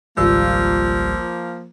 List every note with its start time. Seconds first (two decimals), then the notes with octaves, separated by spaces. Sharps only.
0.18 G#1 C#2 F3 G3 A#3 F4 E6